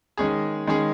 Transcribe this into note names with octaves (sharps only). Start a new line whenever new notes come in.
D#3 G#3 C#4 G#4
D#3 G#3 C#4 G#4